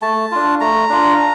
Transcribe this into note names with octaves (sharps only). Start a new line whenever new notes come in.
A3 A5
D4 F4
A3 A#5
D4 F4